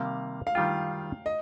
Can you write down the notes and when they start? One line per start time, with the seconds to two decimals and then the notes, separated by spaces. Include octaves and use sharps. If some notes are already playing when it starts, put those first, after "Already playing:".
Already playing: C3 D#3 G3 A#3 F5
0.47 F5
0.55 D#3 G3 D4 F4 G5
1.26 D#5